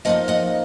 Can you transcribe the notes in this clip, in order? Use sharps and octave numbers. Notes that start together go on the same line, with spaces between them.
F3 A#3 D#4 D#5 F#5
D#5 F#5